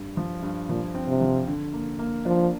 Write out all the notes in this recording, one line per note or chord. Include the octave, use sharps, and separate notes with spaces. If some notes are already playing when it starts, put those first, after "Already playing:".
Already playing: G2
F3
G2
A#2 F3
C4
C3
F3
D3
A#3
A#3
F3 D4